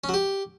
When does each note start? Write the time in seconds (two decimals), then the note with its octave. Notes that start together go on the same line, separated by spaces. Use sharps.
0.04 C#4
0.09 F#3
0.14 G4